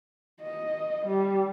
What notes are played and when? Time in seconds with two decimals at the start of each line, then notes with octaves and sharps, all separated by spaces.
0.42 D#5
1.06 G3